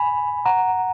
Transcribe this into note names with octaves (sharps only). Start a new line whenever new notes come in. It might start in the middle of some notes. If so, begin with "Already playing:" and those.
Already playing: G#5 B5
F#5 A#5